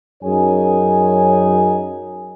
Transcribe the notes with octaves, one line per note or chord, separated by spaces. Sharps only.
F#2 D#4 G#4 C#5 G#5